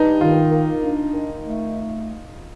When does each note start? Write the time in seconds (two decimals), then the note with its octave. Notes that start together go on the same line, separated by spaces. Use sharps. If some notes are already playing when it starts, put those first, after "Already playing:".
Already playing: G2 D#4
0.21 D#3 F4
0.51 A#3
0.83 D4
1.13 D#3
1.44 A3